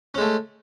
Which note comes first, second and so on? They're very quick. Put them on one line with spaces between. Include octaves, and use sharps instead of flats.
C#4 G#3 A3